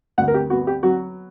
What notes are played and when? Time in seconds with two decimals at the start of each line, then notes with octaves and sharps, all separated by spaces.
0.18 D2 F#5
0.28 A#4
0.34 G4
0.50 B3 F#4
0.67 G4
0.83 F#3 F#4